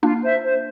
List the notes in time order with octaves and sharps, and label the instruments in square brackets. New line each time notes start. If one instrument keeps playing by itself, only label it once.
[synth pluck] A#3 D4 [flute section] F4
[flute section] C5 E5
C5